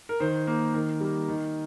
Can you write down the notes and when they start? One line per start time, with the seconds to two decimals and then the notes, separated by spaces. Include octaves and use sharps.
0.09 A#4
0.20 D#3 C5
0.47 A#3
0.74 D#3 A#4
1.01 G3 A#3
1.28 D#3